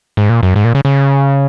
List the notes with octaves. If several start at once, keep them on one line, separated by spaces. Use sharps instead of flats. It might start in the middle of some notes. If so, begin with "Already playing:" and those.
G#2
A#2
F#2
G#2
A#2
C#3
C#3